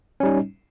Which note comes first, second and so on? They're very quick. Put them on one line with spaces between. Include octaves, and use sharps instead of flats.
C#4 G3 D#4